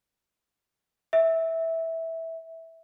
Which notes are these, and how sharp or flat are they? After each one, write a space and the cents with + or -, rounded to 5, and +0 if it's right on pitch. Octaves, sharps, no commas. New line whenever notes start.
E5 -10